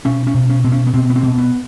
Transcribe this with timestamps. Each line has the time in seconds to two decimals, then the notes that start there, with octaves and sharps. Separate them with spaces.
0.05 B2 C#4
0.27 C#4
0.34 B2
0.49 C#4
0.64 B2 C4
0.72 C#4
0.87 B3
0.93 B2 C4
1.10 B3
1.16 C4
1.23 B2
1.38 B3